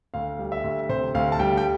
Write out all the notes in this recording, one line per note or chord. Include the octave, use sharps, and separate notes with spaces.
D2 F5
G3
E5
D2
C3 C5
D2 F5
A5
G3 G5
G5